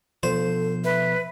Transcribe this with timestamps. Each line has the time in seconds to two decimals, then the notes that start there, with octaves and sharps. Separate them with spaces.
0.23 B2 F3 A4 C5
0.84 B4 E5